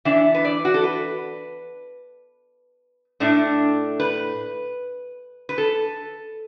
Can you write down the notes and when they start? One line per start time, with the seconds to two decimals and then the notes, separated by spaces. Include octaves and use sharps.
0.05 E3 B3 D4 E5
0.35 B4
0.45 D5
0.65 F#4
0.74 A4
0.83 B4
3.20 A2 A3 D4
4.00 B4
5.49 B4
5.58 A4